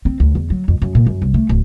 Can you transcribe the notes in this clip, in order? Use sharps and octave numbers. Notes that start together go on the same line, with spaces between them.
C4
D2
E2
F#3
F2
F#2
A#2
F#2
C2
A3
D1